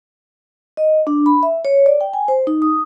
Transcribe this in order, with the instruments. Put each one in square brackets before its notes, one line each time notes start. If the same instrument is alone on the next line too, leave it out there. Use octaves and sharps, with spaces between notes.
[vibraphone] D#5
D4
B5
E5
C#5
D5
G5
G#5
C5
D#4
D#6